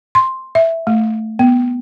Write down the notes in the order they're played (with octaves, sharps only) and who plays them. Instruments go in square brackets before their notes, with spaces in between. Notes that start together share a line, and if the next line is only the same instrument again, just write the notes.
[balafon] C6
E5
A3
B3